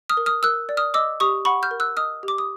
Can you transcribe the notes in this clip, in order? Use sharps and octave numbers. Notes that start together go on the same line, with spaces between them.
D#6 F6
A#4
D#6 F6
A#4 E6 F#6
D5
D#6 F6
D#5 D6 E6
G4 C#6 D#6
F#5 B5 C#6
F6 G6
A#4
E6 F#6
D#5 D#6 F6
G4
D6
D#6